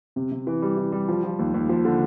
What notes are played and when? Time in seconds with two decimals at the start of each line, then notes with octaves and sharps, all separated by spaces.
0.16 C3
0.32 C3
0.47 E3
0.62 G3
0.77 E3
0.92 G3
1.08 F3
1.24 F3
1.39 D#2
1.54 D#2
1.69 F3
1.85 D3